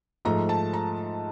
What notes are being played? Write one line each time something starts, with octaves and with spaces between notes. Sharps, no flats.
G#2 F3 A3 A#5
A5
A#5